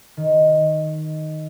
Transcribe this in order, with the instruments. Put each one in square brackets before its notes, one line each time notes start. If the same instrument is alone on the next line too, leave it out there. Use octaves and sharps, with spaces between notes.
[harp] D#3